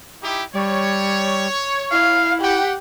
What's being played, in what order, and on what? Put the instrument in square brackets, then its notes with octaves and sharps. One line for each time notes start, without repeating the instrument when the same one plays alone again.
[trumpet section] D#4 E4 G4
[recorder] G3 [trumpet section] C#5
[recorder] E4 [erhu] F5
[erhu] G4 [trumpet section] F#5 G5